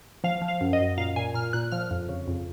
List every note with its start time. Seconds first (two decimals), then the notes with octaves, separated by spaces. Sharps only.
0.24 F3 F5
0.42 F3
0.48 F5
0.61 F#2
0.73 D#5
0.80 F#2
0.97 A#2 F5
1.16 A#2 G#5
1.34 A#2 F6
1.53 A#2 F#6
1.72 F3 F6
1.91 F2
2.09 C#3
2.28 F2